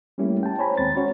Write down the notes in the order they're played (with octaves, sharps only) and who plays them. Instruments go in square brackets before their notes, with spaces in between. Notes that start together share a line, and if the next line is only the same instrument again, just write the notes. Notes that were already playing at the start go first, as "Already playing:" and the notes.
[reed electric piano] G3 A3 A#3 C#4 E4 G4
G5 A5
C5 C#5 G#5 A#5 B5
D#2 D#3 G#3 C4 A6
C#4 F#4 C#5